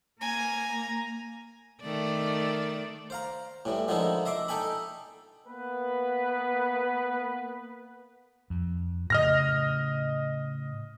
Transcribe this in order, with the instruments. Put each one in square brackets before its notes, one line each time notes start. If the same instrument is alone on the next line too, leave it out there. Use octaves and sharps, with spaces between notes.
[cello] A#3 [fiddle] G#5 [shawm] A#5
[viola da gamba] D#3 A3 D5
[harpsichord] C5 F5 A#5
A2 E3 G3
D3 D#3 F3 G#3 D#4 E4
D#5 E5 C6 D6
D#4 A4 G5 G#5 B5
[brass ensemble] A#3 B3 B4
[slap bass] F2
[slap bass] A2 C#3 [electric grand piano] D#5 F6 A#6